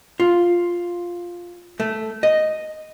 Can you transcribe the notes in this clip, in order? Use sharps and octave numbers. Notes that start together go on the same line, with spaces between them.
F4
A3
D#5